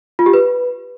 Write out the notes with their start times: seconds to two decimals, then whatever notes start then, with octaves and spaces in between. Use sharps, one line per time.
0.19 F4
0.26 G4
0.33 B4